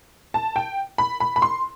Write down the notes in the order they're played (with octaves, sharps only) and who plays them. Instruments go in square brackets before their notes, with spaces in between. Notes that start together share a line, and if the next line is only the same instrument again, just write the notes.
[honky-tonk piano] A5
G5
B5
B5
B5
C6